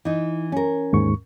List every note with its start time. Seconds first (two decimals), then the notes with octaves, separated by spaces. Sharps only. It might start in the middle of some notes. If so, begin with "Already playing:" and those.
0.05 E3 D#4
0.52 C#4 A#4
0.93 D#2 G#2 C#6